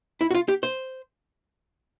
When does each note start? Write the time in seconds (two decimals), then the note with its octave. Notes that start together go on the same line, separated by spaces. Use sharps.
0.21 E4
0.31 F#4
0.35 F4
0.48 G4
0.63 C5